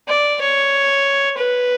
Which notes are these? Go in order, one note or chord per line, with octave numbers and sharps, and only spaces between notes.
D5
C#5
B4